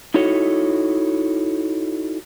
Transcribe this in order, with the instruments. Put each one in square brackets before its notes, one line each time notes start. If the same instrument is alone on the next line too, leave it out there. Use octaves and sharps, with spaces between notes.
[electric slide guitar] D#4 E4 F#4 A4 C#5